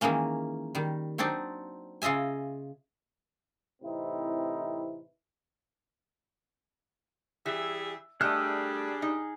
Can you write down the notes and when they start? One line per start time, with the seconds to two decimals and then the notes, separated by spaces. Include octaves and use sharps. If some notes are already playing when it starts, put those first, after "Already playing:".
0.01 D#3 E3 G#3 A#3 C#4
0.75 D#3 G3
1.18 F#3 C4 D4 D#4 D5
2.02 C#3 F4 D#5 E5 G#5
3.82 A2 C3 E3 C4 D#4 E4
7.46 E3 G3 G#4 E5
8.21 G3 A3 D4 G#4 D#5 F6 F#6
9.02 D#4